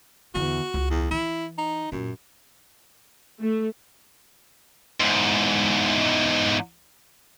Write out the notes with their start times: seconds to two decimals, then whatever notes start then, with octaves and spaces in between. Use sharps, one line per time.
0.35 E2 D3 F#4
0.74 C#2
0.90 E2
1.11 E3 E4
1.58 D#4
1.92 F#2 A#2
3.40 A3
5.00 E2 G#2